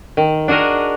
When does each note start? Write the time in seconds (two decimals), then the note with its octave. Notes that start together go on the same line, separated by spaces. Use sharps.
0.17 D#3
0.48 D4 F#4 G#4 A#4 D#5